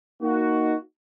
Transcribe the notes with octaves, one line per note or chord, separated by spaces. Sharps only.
A#3 D#4 F#4